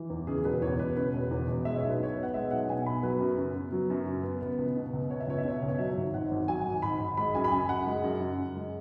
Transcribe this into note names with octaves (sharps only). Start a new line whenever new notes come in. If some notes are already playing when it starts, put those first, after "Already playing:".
Already playing: E3
E2
C#3 G#4
E1 B4
E2 C#5
E1 B4
C#3 B4
E1
E2
E1
G#3 E5
B1 C#5
B4
B2 C#5
B3
F#5
G#3 E5
B1 F#5
B2 G#5
B3 B5
F#3 B4
F#2
C#3
B3
F#3
F#2
C#3
B3
B3
C#2
B2
C#2
B3 C#5
E5
C#2 C#5
E5
B2 C#5
C#2
C#5
F#3 E5
G#1
G#2 F#5
G#1
F#3 G#5
G#1
G#2 B5
G#1
G#3 B5
F#2 G#5
B5
C#3 G#5
F#2 F#5
G#3
F#2
C#3
F#2
G#3